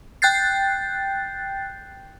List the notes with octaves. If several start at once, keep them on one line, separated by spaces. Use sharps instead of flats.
G5 F#6 G6 A6 C7